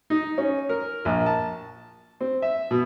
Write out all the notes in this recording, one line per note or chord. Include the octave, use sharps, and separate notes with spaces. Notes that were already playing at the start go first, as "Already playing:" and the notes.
D#4
C#4
A#4
A#1
A5
C4
E5
B2